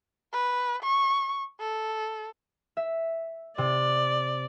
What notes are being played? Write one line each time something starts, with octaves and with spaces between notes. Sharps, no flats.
B4
C#6
A4
E5
C3 D5